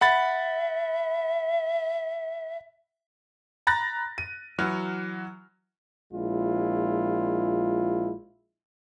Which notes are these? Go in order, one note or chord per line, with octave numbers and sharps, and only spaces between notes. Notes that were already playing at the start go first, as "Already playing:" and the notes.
E5 F#5 B5 A6
A#5 B5 F#6 A6 A#6
D#7
E3 F#3 F#4 F6
A#1 G#3 E4 F4